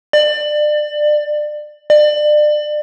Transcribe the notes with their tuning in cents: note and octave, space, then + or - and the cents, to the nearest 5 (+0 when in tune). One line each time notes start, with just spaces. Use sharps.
D5 +25
D5 +30